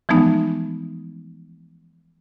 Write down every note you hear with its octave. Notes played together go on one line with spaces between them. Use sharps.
E3 F3 G#3 A3 B3 D#4